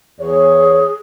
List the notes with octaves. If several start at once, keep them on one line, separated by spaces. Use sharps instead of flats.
E2 G#4 C#5